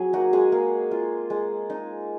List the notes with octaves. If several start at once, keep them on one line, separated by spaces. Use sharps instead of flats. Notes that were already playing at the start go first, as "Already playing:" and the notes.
Already playing: F#3 C4 G#4
A#3 D#4 F#4
G#3 G#4
A#3
F4
G#3
D#4